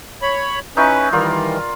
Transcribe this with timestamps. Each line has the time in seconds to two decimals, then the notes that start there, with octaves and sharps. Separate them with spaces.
0.22 C#5 B5
0.77 C#4 D#4 E4 B4 C#6
1.13 D#3 E3 G3 F4 A#4 D5